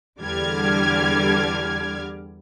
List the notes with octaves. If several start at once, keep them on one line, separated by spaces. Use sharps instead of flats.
E2 D3 G3 D6 F6 G#6